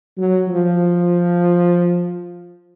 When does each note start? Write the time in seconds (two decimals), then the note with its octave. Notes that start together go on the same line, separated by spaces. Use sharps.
0.18 F#3
0.48 F3